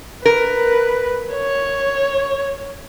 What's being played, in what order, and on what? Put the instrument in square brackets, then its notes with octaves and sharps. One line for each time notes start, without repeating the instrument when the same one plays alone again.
[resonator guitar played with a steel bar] A#4 [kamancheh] B4
[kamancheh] C#5